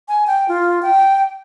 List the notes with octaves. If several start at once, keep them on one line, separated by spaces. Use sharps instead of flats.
G#5
G5
F4
G5